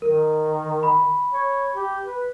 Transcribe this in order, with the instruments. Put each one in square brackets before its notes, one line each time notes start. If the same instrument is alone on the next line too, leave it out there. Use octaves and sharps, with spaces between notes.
[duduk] D#3 [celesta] A#4
[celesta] B5
[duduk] C#5
G4
B4